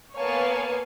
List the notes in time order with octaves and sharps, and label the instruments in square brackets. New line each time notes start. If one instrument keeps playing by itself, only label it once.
[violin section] A#3 B3 C#5 F5 G#5 A5